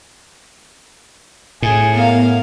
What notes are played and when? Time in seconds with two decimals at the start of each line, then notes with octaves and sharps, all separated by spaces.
1.62 A2 G#4
1.94 B3 A#4 F5